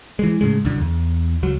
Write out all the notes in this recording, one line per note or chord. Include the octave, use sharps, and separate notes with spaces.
E3 G#3
A2 C#3 G#3
C2 F#2 D3
E2
C#2 F#3